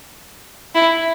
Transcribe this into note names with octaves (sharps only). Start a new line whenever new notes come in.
E4